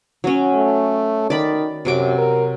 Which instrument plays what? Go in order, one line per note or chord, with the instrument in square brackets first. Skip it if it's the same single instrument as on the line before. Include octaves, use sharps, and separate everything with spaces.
[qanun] F#3 C#4
[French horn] A3
[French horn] D#3 [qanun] D5 B5
[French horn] F#2 [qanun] C3 F#3 D6
[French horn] A#4